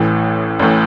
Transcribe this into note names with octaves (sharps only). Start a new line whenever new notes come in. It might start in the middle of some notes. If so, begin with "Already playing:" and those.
Already playing: A1 A2 E3
A1 A2 E3